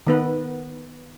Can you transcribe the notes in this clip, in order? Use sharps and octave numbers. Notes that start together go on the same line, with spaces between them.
D#3 B3 B4